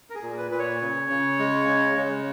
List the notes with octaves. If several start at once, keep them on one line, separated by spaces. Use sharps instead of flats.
A#4
G#4
A#2
B4
A#2 B4
C#5
C#3
C#3
G#3
C#3
C#3